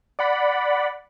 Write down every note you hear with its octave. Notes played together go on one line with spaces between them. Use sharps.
D5 F#5 B5